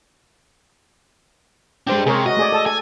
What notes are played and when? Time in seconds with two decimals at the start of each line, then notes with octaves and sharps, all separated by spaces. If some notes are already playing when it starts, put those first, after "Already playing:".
1.87 G#3 D4 G4 C5 G5
2.06 C3 G#4 A#4 C#5
2.26 F#4 D#5
2.37 A3 G#4 D5
2.52 A4 A5
2.66 A4 G#5